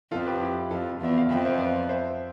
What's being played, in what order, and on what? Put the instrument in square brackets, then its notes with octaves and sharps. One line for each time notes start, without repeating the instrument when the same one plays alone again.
[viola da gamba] F2 [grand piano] F4 A4
[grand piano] G4 B4
E4 G4
[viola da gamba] F2 [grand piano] F4 A4
[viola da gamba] E2 [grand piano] E5
[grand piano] F5
[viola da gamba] F2 [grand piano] E5 G5
[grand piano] C5 E5
B4 D5
C5 E5